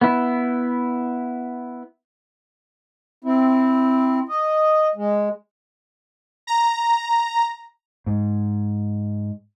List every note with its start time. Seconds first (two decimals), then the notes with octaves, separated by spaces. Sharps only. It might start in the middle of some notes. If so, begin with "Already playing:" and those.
0.01 B3 E4
3.24 C4 E4
4.29 D#5
4.95 G#3
6.47 A#5
8.06 G#2